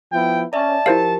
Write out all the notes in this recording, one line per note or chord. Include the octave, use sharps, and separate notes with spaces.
F3 B3 E4 G5
C#4 D5 E5 A5
F3 E4 G4 A#4 C5 F5